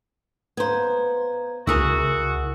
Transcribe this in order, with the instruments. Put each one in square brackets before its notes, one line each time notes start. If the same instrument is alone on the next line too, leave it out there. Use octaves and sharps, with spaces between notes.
[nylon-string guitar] B3 C5 [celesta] F5 A#5 G#6
[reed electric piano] C#2 [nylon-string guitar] E4 G#4 A#4 [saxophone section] F#4 [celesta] D#6 E6